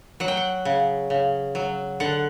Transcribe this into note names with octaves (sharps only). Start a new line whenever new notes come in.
F#3 F#5
G5
F#5
C#3
C#3
F#3
D3 F#5